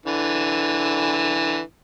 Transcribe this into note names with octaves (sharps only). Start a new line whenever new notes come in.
D3 E3